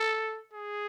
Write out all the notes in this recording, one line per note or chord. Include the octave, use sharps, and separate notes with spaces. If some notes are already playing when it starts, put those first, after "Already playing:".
Already playing: A4
G#4